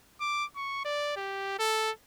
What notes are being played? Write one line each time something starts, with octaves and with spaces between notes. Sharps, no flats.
D6
C#6
D5
G4
A4